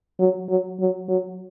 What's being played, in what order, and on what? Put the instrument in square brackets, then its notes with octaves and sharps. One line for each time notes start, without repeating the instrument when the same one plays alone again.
[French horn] F#3
F#3
F#3
F#3